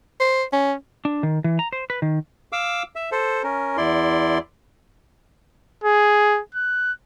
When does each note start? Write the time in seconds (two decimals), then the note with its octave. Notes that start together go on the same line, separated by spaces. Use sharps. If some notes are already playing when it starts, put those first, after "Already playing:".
0.20 C5
0.53 C#4
1.05 D4
1.23 D#3
1.44 E3
1.59 A#5
1.73 C5
1.90 B4
2.02 D#3
2.53 F5 D6 E6
2.96 E5
3.12 A4 C5
3.43 C#4 A#4
3.77 E2 E4 D5 C6
5.84 G#4
6.55 F#6